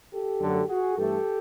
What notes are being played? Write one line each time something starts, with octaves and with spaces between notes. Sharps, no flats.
G4 A4
F#2 D3 F#3 A3
F#4 G#4
G2 E3 A3 G4 A4